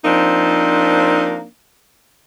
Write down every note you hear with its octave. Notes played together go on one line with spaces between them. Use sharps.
F3 A#3 C4 D4 D#4